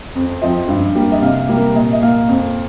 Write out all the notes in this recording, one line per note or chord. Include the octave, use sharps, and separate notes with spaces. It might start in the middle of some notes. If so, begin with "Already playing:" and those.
F2
F3 C4 D#5
G2
G3 A#3
D#5
C3 F5
G3 A#3
A#4
A#2 D#5
D#5
A#3 F5
F2